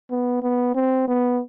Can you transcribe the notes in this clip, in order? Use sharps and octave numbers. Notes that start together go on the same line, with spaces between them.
B3
B3
C4
B3